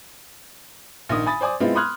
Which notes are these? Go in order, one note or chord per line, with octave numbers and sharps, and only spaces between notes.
A#1 D#3 D#6
G#5 B5 D#6 A6
C5 D5 G#5 D#6
G#3 B3 C4 E4 F4
B5 C6 D#6 F6 F#6 G#6